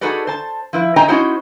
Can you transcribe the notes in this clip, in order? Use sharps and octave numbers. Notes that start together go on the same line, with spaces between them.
D#4 F#4 G#4 A4 B4 D5
C5 A5
F3 E4 B4
D#4 C5 D#5 G5 G#5 A#5
C#4 D#4 E4 F#4 C5 C#5